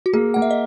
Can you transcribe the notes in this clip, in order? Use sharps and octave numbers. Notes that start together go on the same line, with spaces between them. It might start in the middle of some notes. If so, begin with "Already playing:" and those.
F#4
A#3 G#4
A#3 F#5
E5
D#5